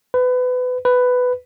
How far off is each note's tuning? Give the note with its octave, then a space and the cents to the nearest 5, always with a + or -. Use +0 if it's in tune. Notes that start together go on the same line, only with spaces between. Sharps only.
B4 +25
B4 +10